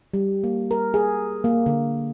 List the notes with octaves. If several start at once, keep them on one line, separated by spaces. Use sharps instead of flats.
G3
A#3
A#4
G#4
A#3
D3